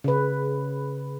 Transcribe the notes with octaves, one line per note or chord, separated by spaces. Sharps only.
C#3 B4